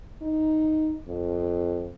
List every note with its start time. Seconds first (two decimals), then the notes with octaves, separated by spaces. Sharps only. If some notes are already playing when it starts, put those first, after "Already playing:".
0.22 D#4
1.08 F2